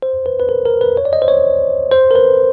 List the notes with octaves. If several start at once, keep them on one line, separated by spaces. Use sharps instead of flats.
C5
B4
B4
A#4
A#4
B4
C#5
D5
D#5
C5
C#5
C5
A#4
B4